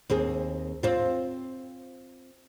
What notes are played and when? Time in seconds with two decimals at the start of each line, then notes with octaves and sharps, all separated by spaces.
0.10 D#2 C4 G#4
0.83 C4 F4